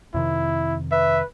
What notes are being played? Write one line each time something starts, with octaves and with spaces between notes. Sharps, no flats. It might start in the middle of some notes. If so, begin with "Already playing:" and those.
F2 C3 D#3 E4
B4 E5